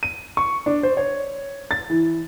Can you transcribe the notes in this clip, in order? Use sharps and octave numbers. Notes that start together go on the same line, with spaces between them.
D#7
C#6
D4
C5
C#5
A6
E3